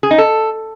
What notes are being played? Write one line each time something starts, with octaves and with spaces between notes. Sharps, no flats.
G#4
D#4
A4